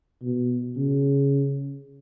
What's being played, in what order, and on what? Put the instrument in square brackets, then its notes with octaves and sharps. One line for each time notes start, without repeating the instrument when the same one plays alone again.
[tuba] B2
C#3